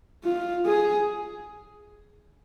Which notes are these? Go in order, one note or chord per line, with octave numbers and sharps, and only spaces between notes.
F4
G#4